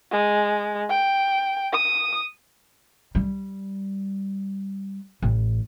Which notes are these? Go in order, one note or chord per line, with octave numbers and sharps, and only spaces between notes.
G#3
G5
D#6
G3
A1